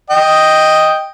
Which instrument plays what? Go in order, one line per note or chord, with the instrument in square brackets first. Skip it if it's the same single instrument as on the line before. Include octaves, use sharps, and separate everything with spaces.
[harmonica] D#5 G5